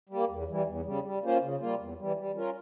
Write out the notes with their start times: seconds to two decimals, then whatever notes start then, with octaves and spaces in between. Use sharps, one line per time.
0.09 G3 A#3
0.29 E2
0.48 E3 G3
0.66 E2
0.85 C#3 G3
1.04 G3
1.23 A#3 C#4 F4 C5
1.41 C#3
1.60 G3 A#3 F4
1.79 E2
1.98 E3 G3
2.17 G3
2.35 C#4 F4 A#4